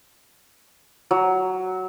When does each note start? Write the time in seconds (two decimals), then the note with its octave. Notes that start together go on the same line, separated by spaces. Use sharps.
1.11 F#3